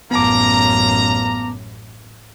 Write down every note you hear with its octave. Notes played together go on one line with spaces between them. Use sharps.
A1 F#2 A#3 B3 A5 A#5 D6